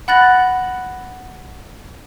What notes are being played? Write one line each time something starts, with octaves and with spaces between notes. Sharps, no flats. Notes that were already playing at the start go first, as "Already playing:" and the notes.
F#5 B5 F#6 A6 A#6 F#7